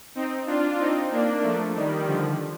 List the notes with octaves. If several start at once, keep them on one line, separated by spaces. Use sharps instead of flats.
C4 D#4
D4 F4
C4 D#4
A#3 D4
F3 A3
D#3 G3
D3 F3